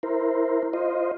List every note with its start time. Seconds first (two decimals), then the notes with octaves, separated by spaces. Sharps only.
0.03 E4 A#4 C5
0.73 F4 C5 D#5